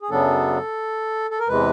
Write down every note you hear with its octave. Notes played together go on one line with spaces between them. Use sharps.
G#4
F#2 C#3 F#3 B3 D4 A4
A4
A#4
E2 C3 E3 G#3 B4